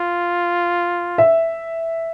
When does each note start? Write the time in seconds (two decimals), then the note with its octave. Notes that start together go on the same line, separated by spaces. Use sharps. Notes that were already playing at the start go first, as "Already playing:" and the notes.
Already playing: F4
1.18 E5